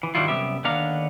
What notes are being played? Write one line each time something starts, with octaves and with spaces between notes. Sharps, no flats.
E3
G2 D#3 F#3 G3 E4 F4
C2 F#2 B3 G4 E5
D#2 D3 B3 D4 F5 A#5